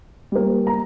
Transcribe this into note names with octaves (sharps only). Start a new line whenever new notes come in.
G3 A#3
A#5